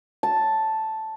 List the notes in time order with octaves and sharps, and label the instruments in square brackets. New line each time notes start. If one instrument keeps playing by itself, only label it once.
[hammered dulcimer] A5